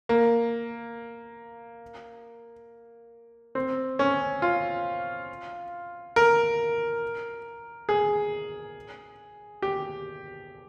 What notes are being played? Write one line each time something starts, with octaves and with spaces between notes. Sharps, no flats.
A#3
C4
C#4
F4
A#4
G#4
G4